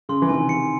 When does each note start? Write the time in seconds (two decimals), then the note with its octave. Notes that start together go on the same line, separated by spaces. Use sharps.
0.09 C#3 C6
0.22 E3
0.29 C3 D#3 G#5
0.49 C#7